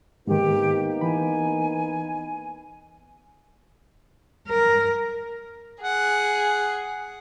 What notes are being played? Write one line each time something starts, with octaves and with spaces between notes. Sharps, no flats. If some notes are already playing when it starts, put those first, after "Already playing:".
G#2 D#3 A#3 B3 D#4 G4
E3 G#5 B5
A#4
G#4 F#5